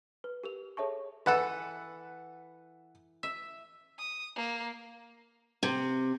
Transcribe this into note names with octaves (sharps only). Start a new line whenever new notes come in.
B4
G4 A#4 F7
G#4 A4 C#5 E5 A5 C#6
E3 A4 B4 F#5
E5
D#6
A#3
C3